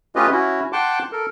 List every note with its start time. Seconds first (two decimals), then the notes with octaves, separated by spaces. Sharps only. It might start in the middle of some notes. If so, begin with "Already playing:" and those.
0.16 A3 C#4 F4 G4 B4 D#5
0.31 C#4 E4 F#4
0.73 F#5 G5 A5 C6 D6
1.12 A4 A#4